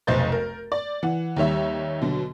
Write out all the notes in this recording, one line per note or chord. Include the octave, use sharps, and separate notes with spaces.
F1 B1 C5 D#5 G6 A6
A#4
D5
E3 F#5
D#2 D#3 G3 C#5 E5
B2 D3 F#3